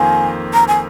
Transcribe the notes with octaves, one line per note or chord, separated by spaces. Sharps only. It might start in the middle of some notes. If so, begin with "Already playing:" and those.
Already playing: F2 D#3 A#3 F4 C5 G#5
A#5
G#5